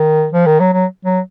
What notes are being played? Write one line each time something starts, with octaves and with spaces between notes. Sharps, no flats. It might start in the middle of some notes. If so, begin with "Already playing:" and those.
Already playing: D#3
F3
D#3
F#3
F#3
F#3